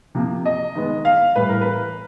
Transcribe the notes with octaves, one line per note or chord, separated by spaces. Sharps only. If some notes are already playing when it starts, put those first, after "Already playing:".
C3 F3 A#3
D#5
D#3 G#3 B3
F5
A2 E3 G3 B4
A#4
B4